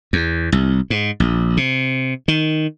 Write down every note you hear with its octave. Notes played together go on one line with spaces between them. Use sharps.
E2
C2
G#2
A#1
C3
D#3